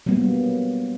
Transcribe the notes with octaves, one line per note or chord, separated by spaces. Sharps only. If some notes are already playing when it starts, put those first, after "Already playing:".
F#3 G3 A#3 B3